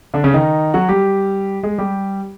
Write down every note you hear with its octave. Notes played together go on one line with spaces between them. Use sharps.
D3 D4
C#3 C#4
D#3 D#4
F#3 F#4
G3 G4
G#3 G#4
G3 G4